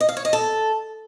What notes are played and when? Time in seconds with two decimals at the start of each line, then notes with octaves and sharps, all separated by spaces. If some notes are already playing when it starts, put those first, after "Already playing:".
0.01 D#5
0.09 F5
0.17 C#5
0.25 D#5
0.33 A4